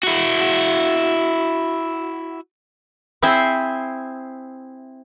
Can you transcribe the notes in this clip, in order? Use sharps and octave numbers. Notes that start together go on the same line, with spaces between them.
E4 F#4
C4 E4 G#4 C5 E5